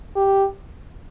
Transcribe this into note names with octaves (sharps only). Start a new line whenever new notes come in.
G4